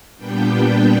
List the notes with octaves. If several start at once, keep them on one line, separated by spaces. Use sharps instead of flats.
A#2 G3 B3 D4 G5
G5